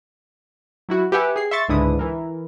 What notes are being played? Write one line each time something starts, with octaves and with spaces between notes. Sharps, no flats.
F#3 E4 F#4
G4 B4 E5 F#5 G#5
G#4 C7
E5 C6 C#6 A6
C#2 G#2 D3 E4 B4 D#6
E3 A#4